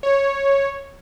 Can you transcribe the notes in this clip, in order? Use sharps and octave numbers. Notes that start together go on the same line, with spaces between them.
C#5